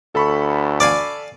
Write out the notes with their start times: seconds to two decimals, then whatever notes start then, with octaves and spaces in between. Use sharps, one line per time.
0.15 D2 A4 B5 C#6
0.80 D5 F5 G#5